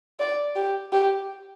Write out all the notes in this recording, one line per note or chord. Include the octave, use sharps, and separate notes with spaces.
D5
G4
G4